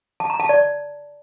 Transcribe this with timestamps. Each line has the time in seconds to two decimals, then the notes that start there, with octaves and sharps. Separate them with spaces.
0.20 A5
0.30 A#5
0.40 A5
0.49 D5